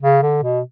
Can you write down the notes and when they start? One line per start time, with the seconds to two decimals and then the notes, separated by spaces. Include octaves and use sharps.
0.02 C#3
0.22 D3
0.43 B2